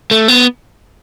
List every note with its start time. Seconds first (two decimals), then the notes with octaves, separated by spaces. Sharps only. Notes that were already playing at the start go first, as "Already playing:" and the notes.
0.11 A3
0.28 B3